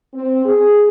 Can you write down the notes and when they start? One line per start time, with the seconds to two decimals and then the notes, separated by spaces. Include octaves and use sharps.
0.14 C4
0.45 G#4